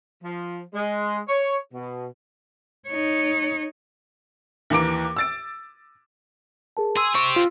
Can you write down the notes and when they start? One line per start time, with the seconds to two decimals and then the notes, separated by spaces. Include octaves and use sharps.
0.23 F3
0.74 G#3
1.29 C#5
1.73 B2
2.88 D#4 C#5
4.70 D#2 E3 A#3 D6 D7
5.17 E6 A6 D7
6.77 G#4 A#4 A5
6.97 G#4 C6 E6
7.15 C4 G4 C#6
7.36 F4